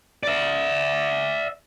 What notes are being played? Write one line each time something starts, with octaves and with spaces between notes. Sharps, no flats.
D5 E5